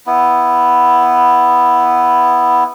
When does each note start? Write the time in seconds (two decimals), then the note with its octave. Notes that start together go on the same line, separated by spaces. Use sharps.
0.07 B3 E4